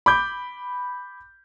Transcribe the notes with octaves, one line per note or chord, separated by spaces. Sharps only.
B5 D6 G6